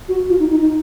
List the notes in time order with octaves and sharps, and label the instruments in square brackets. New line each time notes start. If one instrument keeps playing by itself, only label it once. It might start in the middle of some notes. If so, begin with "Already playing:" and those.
[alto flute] F#4
F4
D#4
D#4
D#4